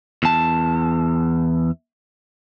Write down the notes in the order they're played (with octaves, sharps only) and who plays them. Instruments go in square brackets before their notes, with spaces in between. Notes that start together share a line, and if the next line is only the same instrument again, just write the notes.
[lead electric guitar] E2 A5